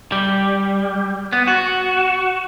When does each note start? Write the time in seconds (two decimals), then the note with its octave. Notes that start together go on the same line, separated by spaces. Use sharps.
0.12 G3
1.33 B3
1.47 F#4